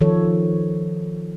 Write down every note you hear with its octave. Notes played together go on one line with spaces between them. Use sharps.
D#3 F3 F4 A4 C#5